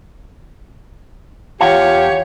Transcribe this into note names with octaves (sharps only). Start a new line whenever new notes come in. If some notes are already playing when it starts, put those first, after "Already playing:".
E2 F4 G4 C#5 F#5 G#5